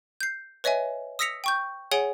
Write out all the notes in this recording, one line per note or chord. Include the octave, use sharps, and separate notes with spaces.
G6 C7
B4 C#5 D#5 E5 G#5
D#6 E6 A#6 B6 C#7 F7
G5 C#6 G6
G#4 C#5 F#5 G#5 D7 G7